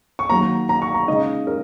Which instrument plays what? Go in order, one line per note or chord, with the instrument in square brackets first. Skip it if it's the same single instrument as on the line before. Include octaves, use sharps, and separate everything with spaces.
[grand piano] C#6
D#3 F#3 A#3 A#5
A#5
C#6
A#5
C#3 G#3 D#4 D#5
A#4